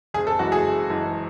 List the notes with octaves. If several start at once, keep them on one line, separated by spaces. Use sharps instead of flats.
F#1 G#4
A4
F#2 E3 G#3 F#4
G#4
F#1
F#2 E3 G#3